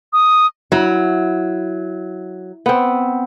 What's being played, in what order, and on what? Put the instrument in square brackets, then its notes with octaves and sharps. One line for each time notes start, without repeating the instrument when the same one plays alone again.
[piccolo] D#6
[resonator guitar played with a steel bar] F#3 [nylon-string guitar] E4
[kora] B3 C4